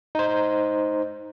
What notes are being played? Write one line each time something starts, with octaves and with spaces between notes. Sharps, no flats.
D#4 C5